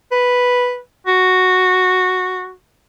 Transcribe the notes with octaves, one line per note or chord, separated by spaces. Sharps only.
B4
F#4